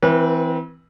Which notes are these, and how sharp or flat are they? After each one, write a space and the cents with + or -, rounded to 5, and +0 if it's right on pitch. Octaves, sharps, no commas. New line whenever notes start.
E3 +0 C4 -20 B4 -40